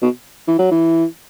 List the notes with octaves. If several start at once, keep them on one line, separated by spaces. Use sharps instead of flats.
B2
E3
F#3
E3